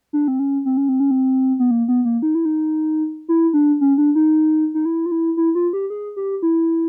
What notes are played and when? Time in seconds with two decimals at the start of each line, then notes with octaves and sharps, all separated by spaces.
0.13 D4
0.28 C4
0.39 C#4
0.65 C4
0.77 C#4
0.89 C4
1.00 C#4
1.11 C4
1.59 B3
1.71 A#3
1.88 B3
2.05 A#3
2.22 D#4
2.35 E4
2.45 D#4
3.29 E4
3.54 D4
3.81 C#4
3.98 D4
4.15 D#4
4.74 D#4
4.85 E4
5.06 F4
5.12 E4
5.37 E4
5.55 F4
5.73 G4
5.90 G#4
6.16 G4
6.43 E4